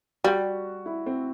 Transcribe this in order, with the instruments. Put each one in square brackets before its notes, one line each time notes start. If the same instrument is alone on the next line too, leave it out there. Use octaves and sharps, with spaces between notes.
[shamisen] G3 [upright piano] F#4
[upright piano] E4
C4